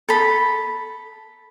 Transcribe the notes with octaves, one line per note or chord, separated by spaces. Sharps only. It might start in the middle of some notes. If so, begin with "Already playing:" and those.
A4 B5